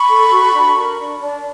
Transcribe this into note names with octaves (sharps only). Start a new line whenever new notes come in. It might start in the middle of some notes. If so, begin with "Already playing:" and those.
Already playing: B5 C#6
A4
F#4
D4
A#4
D4
D4